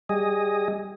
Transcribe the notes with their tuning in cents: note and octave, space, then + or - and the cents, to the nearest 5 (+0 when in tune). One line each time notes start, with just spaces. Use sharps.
G3 +0 G#4 -15 D#5 +0